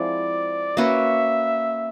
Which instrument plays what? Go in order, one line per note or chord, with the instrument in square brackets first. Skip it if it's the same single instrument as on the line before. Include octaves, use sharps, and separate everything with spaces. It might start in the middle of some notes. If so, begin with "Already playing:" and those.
Already playing: [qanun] F3 G#3 C4 E4 [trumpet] D5
[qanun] A#3 C#4 F#4 B4 [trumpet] E5